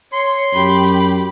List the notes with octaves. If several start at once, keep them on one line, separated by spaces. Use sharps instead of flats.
C#5 C6
F#2 G4 B5